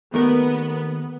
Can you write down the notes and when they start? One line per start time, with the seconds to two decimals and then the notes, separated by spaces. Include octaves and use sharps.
0.14 D#2 A3 B3 A#4